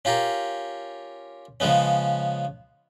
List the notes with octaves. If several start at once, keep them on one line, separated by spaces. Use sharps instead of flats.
C#4 F4 G4 A#4
C#3 F3 G#3 B3 C#4